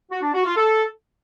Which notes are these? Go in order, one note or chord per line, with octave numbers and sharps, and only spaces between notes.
F#4
D4
F#4
F4
A4